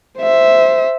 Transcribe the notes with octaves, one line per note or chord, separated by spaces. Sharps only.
C5 E5